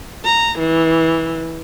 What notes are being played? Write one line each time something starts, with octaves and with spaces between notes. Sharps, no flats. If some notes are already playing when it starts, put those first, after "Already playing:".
A#5
E3